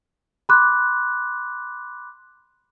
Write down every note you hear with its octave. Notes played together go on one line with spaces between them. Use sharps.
B5 C6 D6 F#6